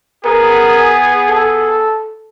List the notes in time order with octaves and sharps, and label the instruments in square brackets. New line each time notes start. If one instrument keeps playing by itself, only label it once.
[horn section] B3 G#4 [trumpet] A#4
[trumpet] A4